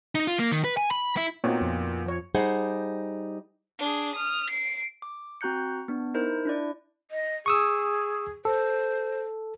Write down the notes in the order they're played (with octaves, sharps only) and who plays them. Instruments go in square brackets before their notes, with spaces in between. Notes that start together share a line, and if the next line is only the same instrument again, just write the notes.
[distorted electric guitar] D#4
F4
A#3
D#3
B4
G#5
B5
E4
[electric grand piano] A#2 B3 [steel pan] C4 D#4 F#4 [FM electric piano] C#5
[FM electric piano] F2
[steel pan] F3 C#5
[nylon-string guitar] G3 D#4 G#4 C5 F#5
[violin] D4 G#4
D#6 F6
C7 D7
[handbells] D6
C4 F#4 A#5 F#6 G6 C#7
B3 D4
D#4 E4 A#4 C5
D4 E4 D5
[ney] D#5
[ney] G#4 [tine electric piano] C#6 D#6 E6
[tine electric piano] A4 [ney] C5